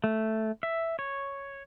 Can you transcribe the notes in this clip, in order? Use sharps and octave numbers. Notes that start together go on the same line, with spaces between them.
A3
E5
C#5